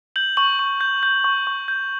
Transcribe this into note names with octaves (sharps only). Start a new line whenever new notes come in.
G6 F#7
C#6 F#7
C#6
G6
G6
C#6
C#6
G6